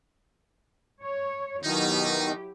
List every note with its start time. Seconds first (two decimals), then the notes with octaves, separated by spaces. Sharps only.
1.03 C#5
1.63 B2 D#3 F#3 D#4 E4 G4